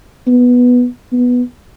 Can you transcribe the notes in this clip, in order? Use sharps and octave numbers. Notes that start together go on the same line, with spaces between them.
B3
B3